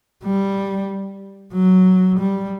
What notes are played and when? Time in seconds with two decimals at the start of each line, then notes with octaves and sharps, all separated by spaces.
0.24 G3
1.54 F#3
2.19 G3